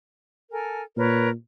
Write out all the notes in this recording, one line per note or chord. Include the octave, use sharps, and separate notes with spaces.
A4 A#4 G#5
A#2 A#4 B4 C#5